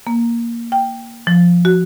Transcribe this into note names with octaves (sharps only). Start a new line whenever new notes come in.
A#3
G5
F3
F#4